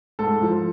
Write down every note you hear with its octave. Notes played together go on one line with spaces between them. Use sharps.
G#2 A4
F3